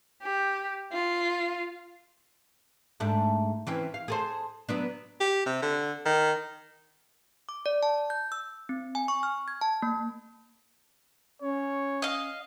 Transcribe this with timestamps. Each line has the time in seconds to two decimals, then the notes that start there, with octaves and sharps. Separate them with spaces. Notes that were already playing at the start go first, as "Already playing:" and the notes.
0.21 G4
0.92 F4
3.00 G#2 A3 D4
3.67 E3 C4 C#4
3.94 F5
4.08 G#4 A4 C5
4.69 F#3 B3 D4
5.20 G4
5.46 C3
5.62 D3
6.06 D#3
7.49 D6
7.66 D5
7.83 A5
8.10 G6
8.32 E6
8.69 C4
8.95 G#5
9.08 C#6
9.23 F6
9.48 G#6
9.61 A5
9.82 A#3
11.42 C#4 C#5
12.02 D#5 F5